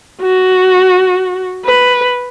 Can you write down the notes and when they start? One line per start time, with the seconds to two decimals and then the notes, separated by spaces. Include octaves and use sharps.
0.22 F#4
1.65 B4